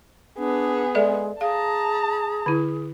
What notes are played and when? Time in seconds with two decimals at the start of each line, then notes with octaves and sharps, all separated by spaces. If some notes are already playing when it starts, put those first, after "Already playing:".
0.38 B3 D4 G#4
0.95 G#3 A4 D5 E5
1.41 G#4 F5 A5 A#5
2.46 D3 E4